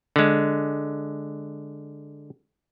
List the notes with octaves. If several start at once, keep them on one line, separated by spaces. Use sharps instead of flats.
D3 G#3